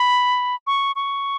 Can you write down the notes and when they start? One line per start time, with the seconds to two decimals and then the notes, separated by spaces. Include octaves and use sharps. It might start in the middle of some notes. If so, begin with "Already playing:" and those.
Already playing: B5
0.67 C#6
0.96 C#6